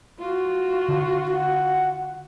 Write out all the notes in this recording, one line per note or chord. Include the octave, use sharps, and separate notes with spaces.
F4 F#4
D3
F#5